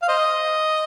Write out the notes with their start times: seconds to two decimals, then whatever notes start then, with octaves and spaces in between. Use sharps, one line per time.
0.02 F5
0.08 C5 D#5